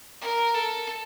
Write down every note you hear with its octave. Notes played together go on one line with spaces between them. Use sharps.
A#4
A4